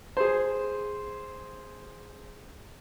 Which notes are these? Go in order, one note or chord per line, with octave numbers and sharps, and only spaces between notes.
G#4 C5